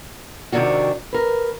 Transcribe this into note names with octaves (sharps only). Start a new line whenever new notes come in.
F2 G#2 C3 D#3 D4 F#4
A#4 B4